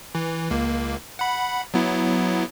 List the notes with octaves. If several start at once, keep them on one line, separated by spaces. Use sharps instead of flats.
E3
C#2 A#3
F#5 B5
F#3 B3 E4